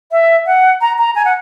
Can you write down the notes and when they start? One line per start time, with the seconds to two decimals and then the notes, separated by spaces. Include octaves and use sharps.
0.12 E5
0.46 F#5
0.81 A#5
0.99 A#5
1.15 G#5
1.25 F#5